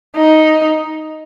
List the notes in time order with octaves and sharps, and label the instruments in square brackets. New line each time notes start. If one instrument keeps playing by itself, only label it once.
[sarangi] D#4